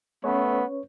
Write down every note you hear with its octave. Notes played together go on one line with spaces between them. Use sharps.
A3 B3 C#4 B4 C#5